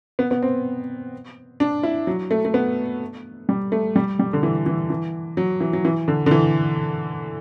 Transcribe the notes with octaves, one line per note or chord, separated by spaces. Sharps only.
B3
B3
C4
D4
E4
F#3
A3
A3
B3
G3
A3
G3
G3
D3
E3
E3
E3
F#3
E3
F#3
E3
D3
D3
E3